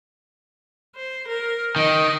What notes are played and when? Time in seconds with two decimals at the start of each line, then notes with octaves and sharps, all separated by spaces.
0.95 C5
1.28 A#4
1.76 D#3 D#5